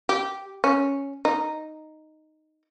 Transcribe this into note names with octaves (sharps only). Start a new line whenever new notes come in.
G4
C#4
D#4